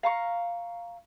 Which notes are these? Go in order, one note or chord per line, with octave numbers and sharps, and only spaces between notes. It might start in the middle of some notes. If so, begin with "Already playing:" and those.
F5 A#5 C#6